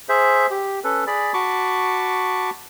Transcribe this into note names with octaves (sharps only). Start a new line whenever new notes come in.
G#4 C5 E5
G4
C#4 A4 B4
G#4 D5 B5
F#4 A5 B5 C#6 D6